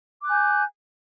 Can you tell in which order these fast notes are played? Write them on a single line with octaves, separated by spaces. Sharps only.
D6 F#6 G#5 G6